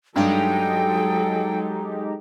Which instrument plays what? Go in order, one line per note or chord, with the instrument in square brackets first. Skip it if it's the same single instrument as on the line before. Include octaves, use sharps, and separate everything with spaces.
[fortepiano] G2 [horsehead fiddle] F#3 A4 [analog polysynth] G#3 D#4 G4 [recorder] G5